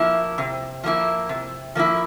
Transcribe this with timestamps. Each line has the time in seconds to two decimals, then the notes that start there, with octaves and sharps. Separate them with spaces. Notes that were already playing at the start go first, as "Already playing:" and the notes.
Already playing: F3 A#3 E4
0.38 C3
0.84 F3 A#3 E4
1.29 C3
1.75 F3 A#3 E4